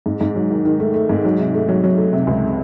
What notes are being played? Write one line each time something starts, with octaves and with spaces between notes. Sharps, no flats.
G#2
G#2
F#3
D#3
D#3
A3
A3
G#2
F#3
C3
A3
F#3
F#3
A3
C3
C#2